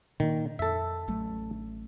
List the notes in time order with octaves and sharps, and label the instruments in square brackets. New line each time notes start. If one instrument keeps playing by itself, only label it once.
[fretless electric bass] A#2 A#3 [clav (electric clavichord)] D#3
[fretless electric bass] F2 [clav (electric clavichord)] A4 E5
[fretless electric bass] A1 F#3 A3